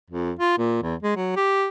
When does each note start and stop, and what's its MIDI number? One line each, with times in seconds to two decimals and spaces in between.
0.10 0.31 41
0.39 0.55 65
0.58 0.78 46
0.83 0.95 40
1.03 1.15 56
1.16 1.35 54
1.36 1.69 67